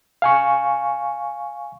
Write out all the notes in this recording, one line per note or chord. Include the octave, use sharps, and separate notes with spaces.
F5 G#5 C#6